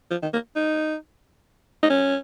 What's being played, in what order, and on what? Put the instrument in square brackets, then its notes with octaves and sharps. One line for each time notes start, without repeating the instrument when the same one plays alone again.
[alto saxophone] F3
D#3
A#3
D#4
D#4
C#4